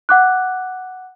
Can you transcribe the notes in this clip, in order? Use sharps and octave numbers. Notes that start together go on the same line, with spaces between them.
F#5 D6 F#6